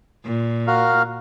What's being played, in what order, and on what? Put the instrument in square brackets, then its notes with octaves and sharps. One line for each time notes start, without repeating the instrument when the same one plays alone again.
[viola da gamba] A#2
[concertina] F#4 A#4 F5